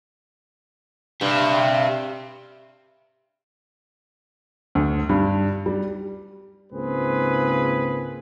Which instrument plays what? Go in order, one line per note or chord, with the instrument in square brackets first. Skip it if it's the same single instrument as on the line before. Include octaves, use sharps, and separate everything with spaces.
[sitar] G2 [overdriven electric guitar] G4 E5
[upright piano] D2
G2
G3
[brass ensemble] C#2 G#2 A#3 C4 G#4 B4